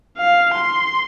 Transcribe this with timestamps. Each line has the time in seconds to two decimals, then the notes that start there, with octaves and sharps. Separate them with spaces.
0.17 F5
0.54 C6